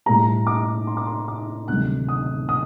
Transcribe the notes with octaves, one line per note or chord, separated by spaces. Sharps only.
A2 G3 A#5
D6
C6
D6
C6
D6
D2 C3 D#3 F#3 A3 F#6
D#6
D#6